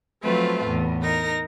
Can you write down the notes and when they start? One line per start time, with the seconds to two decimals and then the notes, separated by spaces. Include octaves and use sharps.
0.23 F3 F#3 A3 C4 F4 B4
0.65 E2 A2
1.01 D#4 A#4 A#6